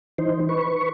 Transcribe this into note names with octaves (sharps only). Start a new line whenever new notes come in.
E3 D#4 C5
B4 C#6